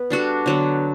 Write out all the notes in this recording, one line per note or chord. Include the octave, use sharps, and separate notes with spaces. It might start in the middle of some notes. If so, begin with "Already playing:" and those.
Already playing: B3 B4
G3 D4 F#4 A4
D3 F#3 B3